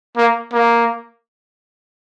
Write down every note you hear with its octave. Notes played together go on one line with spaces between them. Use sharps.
A#3
A#3